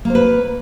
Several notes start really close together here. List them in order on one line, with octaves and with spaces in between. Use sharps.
A#3 C5 B4